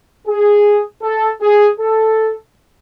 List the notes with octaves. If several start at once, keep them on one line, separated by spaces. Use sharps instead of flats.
G#4
A4
G#4
A4